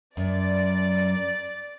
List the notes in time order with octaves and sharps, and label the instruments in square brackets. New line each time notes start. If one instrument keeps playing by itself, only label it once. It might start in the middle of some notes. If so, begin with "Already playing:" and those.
[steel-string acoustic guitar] F#2 [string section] D5